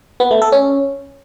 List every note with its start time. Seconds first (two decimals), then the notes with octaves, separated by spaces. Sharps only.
0.20 B3
0.31 A3
0.42 A4
0.52 C#4